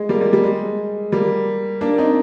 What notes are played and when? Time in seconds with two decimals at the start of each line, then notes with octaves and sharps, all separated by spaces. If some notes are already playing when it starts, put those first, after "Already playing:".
Already playing: G#3
0.09 G3 A#3
0.21 G3
0.33 G3
0.44 G#3
1.12 G3 A#3
1.81 A#3 D4
1.98 C4 D#4